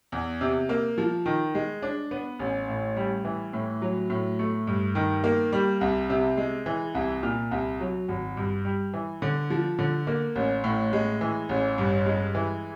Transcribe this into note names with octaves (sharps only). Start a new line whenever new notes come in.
E2
C3
A#3
F3
D#3
G#3
D4
B3
A1
A2
G3
E3
A2
F#3
A2
A3
G2
D#3
A#3
G3
C2
C3
G#3
E3
C2
A#2
C2
F#3
G#1
G2
G3
E3
D3
F3
D3
A#3
A1
A2
G#3
E3
A1
G2
G#3
E3